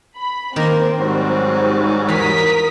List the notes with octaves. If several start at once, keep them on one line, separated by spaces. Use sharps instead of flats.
B5
D#3 A#3 C4 A#4
G#2 F#3 G3 F#4
E2 A#4 F5 D#6 B6